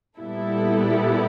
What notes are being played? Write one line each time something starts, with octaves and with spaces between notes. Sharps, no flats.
A#2 G3 B3 E4 A4